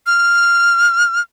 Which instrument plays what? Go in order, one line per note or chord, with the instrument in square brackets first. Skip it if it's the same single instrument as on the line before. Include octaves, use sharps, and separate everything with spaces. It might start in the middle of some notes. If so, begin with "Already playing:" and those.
[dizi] F6